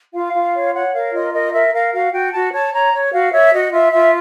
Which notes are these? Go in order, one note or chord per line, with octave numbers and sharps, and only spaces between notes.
F4 F5
F4
C#5
C#5 F#5
A#4 F5
F4 D#5
A#4 D#5
A#4 E5
A#4 F5
F#4 F5
F#4 G5
F#4 A5
C#5 A5
C#5 A#5
C#5
F#4 F5
C#5 E5
F#4 D#5
F4 E5
F4 E5